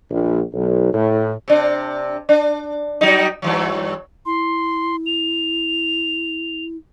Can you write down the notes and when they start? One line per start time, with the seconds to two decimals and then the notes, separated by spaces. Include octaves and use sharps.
0.10 A#1
0.54 B1
0.93 A2
1.48 C3 D4
2.29 D4
3.01 F#3 G3 D#4
3.42 G2 E3 F#3
4.26 E4 C6
5.06 F7